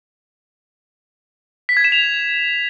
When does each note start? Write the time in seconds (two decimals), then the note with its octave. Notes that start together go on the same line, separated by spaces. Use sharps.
1.69 B6
1.77 G#6
1.84 E7
1.92 F7